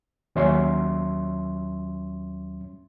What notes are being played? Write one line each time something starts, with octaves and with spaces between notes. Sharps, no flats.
D#2 F#3 C#4 E5 C6